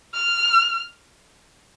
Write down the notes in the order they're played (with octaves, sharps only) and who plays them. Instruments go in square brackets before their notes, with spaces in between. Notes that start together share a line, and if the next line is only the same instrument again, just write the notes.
[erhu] F6